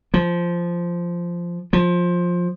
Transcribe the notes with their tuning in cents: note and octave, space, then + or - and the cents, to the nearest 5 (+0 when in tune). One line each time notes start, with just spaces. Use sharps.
F3 -10
F3 +15